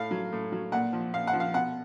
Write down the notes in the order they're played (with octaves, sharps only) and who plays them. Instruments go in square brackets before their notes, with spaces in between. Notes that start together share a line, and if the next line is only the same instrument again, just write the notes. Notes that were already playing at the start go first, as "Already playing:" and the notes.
Already playing: [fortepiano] A2 F5
F#3
A2
F#3
A#2 F#5
F3
A#2 F5
F#5
F3
F5
B2 F#5